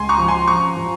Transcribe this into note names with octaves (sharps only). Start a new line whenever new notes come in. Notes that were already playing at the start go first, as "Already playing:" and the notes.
Already playing: C#2 G#5 C6
A#5 C#6
F3
G#5 C6
F3 A#5 C#6
F3